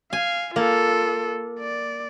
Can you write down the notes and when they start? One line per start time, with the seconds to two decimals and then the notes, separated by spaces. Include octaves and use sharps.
0.13 F5 G#5
0.56 A#3 F4 A4
1.60 D5